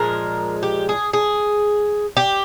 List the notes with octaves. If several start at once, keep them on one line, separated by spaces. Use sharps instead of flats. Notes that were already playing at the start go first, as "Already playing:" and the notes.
Already playing: A#2 F3 G#3 A#4
G4
G#4
G#4
G4